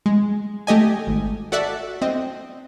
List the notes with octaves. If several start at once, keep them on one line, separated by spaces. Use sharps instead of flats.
G#3
A3 G4 D#5 G#5
G#1
F#4 A4 D5 E5 F#5
C4 D#5